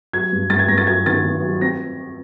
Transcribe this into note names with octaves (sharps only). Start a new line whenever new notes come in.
F#3 G#6
G2
G2 A6
G#6
G2 A#6
A6
F#3 G#6
D#3 A6
D#3
F#3
C4 A#6